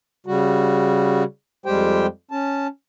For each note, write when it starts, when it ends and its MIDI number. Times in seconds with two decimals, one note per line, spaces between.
0.26 1.23 49
0.26 1.23 55
0.26 1.23 66
1.66 2.06 41
1.66 2.06 55
1.66 2.06 56
1.66 2.06 67
1.66 2.06 72
1.66 2.06 79
2.31 2.67 61
2.31 2.67 81